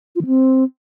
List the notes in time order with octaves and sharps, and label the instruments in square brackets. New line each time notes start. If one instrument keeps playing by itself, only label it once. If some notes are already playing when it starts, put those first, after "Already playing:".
[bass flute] F4
D#3
C4